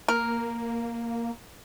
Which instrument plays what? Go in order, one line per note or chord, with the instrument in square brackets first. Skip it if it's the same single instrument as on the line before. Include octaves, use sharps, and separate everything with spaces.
[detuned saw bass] A#3 [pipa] A#4